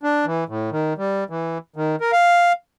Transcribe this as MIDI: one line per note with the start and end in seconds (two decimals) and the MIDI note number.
0.03 0.25 62
0.25 0.44 52
0.49 0.70 45
0.72 0.93 51
0.98 1.24 55
1.30 1.58 52
1.76 1.96 51
2.01 2.11 70
2.12 2.53 77